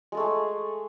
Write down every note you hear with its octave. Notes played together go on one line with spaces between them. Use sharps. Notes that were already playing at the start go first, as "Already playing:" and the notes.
G#3 A3 G#4 A4